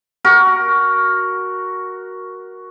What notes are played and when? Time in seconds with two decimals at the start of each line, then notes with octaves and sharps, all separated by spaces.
0.25 F#4 A#4